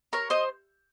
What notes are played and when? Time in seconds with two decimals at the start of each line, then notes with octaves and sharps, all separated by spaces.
0.13 A#4 C#5
0.30 C5 D#5